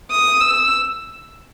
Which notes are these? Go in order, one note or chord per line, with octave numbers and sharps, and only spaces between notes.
D#6
E6